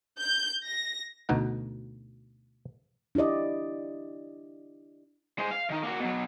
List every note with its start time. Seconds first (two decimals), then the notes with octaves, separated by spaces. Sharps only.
0.18 G6
0.64 A#6
1.29 D2 B2 D#4 F#5
3.15 D4 E4 G4 D5 D#5
5.39 G#3 C5
5.51 F5
5.70 D#3 D#4
5.83 A#3 F#4
6.00 B2 F#3